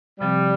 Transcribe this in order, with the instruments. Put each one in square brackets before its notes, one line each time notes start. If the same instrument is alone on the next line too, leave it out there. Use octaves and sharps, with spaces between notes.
[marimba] C3 F3 C4 G4 [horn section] G3